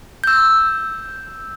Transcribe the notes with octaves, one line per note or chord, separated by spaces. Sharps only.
E6 G6